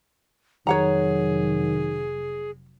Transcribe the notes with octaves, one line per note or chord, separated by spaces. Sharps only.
F1 D#3 F#3 G#4 C#5 F#5 A#5